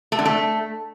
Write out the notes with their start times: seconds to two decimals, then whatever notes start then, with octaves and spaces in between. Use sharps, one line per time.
0.12 A3
0.19 D3
0.25 A3